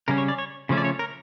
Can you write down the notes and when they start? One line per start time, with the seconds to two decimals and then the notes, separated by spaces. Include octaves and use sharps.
0.08 C#3 G3 C#4 A#4
0.18 C#5
0.28 D5
0.38 C#5
0.69 C#3 F3 A3 C#4
0.77 D5
0.85 C#5
0.99 A#4